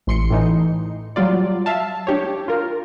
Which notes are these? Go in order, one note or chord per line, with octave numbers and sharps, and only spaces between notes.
A1 C6 C#7
A2 E3 D#4
F#3 G3 F4 D5
E5 F5 A5
D4 G4 C#5
F4 A#4